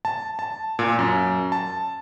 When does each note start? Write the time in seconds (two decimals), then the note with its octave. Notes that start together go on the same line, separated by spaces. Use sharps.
0.05 A5
0.39 A5
0.79 A#2
0.99 F#2
1.52 A5